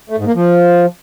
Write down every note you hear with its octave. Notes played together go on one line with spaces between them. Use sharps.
A3
G#2
A#3
F3